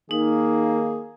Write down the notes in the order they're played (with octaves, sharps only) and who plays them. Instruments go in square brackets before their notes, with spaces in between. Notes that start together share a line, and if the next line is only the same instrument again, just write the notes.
[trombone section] D#3 A#3 [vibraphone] D#4 [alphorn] G#4